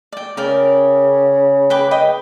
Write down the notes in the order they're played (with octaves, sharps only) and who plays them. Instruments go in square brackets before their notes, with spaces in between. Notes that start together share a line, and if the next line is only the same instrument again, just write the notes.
[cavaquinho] D5 G5
[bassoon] C#3 [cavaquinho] A#4 D5 G5
[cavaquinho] B4 G5 D6
B4 D#5 G5